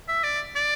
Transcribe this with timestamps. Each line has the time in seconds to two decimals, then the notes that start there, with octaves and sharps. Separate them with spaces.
0.08 E5
0.23 D5
0.56 D5